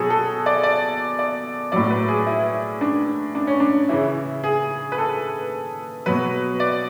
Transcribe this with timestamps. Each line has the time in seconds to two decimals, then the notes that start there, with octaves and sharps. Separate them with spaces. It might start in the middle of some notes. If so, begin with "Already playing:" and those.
Already playing: B2 F#3 G#4 A4
0.10 A4
0.46 D5
0.63 D5
1.19 D5
1.72 A2 F#3 D5
1.90 B4
2.08 G#4
2.26 E4
2.81 D4
3.35 D4
3.47 C#4
3.60 D4
3.89 C#3 E3 E4
4.44 G#4
4.92 B4
4.98 A4
6.06 B2 F#3 B4
6.60 D5